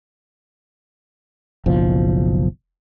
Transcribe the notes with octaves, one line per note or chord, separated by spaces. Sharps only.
F#1 B1 F3